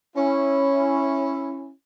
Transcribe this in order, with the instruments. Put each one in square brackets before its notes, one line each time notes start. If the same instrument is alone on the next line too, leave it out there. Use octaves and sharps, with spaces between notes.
[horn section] C#4 E4